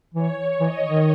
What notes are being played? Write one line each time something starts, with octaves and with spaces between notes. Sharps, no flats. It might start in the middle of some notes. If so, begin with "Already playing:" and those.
E3 C#5
E3 D#5
D#3